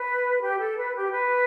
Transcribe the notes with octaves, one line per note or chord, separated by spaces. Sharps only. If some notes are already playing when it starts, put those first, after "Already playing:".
Already playing: B4
G4
A4
B4
G4
B4